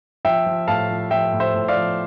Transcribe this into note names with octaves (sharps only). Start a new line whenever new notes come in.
F3 E5 G5
F3
A2 F5 A5
F3
F3 E5 G5
A2
C5 E5
A2
D5 F5
F3